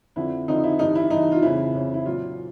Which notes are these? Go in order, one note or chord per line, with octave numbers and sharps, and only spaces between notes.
F2 D3 F3 E4
F2 D3 F3 D#4
E4
G2 E3 D#4
E4
G2 E3 D#4
F4
F2 C#3 E3 E4
F2 C#3 E3
E4
A#2 F#3 F4